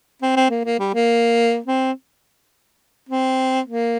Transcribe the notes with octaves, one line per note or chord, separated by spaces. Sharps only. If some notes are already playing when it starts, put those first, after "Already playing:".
C4
C4
A#3
A#3
G3
A#3
C4
C4
A#3